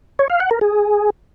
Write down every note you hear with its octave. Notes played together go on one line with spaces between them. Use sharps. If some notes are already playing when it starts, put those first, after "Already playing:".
C#5
F5
F#5
A#4
G#4